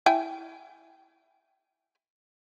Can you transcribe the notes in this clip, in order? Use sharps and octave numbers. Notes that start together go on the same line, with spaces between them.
E4 G5 G#5